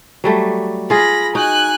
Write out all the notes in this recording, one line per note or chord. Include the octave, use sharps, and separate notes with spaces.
F#3 G3 A3
F4 G#4 B5 A#6
D#4 F#4 G#5 F#6